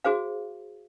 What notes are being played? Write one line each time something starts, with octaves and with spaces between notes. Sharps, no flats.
F#4 G#4 C5 F5